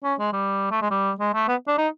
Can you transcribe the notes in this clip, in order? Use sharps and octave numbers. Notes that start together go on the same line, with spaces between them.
C#4
G#3
G3
A3
G#3
G3
G#3
A3
B3
D4
D#4